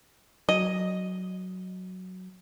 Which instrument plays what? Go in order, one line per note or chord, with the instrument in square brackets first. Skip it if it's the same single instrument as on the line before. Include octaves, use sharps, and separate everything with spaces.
[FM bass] F#3 [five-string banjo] D#5